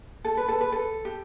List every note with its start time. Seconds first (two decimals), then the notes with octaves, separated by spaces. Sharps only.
0.25 A4
0.37 B4
0.48 A4
0.61 B4
0.72 A4
1.05 G4